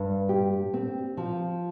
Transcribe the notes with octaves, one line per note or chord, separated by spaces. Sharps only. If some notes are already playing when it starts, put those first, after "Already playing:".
Already playing: G2
G4
C4
F3